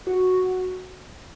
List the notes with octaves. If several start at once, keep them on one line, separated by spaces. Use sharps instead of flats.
F#4